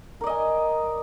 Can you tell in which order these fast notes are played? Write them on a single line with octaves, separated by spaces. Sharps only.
A#4 D5 D#5 G#5